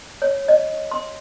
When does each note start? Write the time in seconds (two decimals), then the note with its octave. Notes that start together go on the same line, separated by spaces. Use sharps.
0.22 C#5
0.48 D#5
0.91 C6